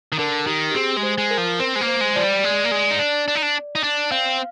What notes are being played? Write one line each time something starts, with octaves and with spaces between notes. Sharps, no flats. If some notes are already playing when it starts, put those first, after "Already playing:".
D#3
D3 A#4
D#3 G4
G4
C4 G#4
G#3
C5
G#3
A#4
F3
C4 C5
G#3
A#3
C5
G#3
F3 D5
G3
G#3
A#3
G#3
D#4
D4
D4
D#4
D4
D#4
D4
C4 F5